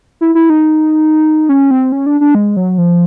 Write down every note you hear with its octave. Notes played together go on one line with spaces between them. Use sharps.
E4
E4
D#4
C#4
C4
C#4
D4
D4
G#3
F#3
F3